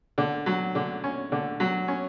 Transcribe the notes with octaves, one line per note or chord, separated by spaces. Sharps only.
D3
F#3
D3
C#4
D3
F#3
C#4